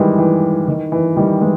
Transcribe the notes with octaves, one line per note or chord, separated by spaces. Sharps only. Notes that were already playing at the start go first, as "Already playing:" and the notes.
Already playing: D#3 E3 G3 G#3
E3
D#3
E3
D#3 G3
E3 G#3